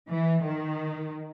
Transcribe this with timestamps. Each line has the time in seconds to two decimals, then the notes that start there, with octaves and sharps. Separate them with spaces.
0.09 E3
0.46 D#3